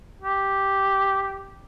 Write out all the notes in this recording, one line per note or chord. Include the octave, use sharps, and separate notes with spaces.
G4